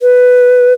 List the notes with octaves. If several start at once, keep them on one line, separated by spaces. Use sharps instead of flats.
B4